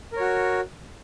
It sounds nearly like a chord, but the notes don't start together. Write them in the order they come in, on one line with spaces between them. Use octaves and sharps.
A#4 C#5 F#4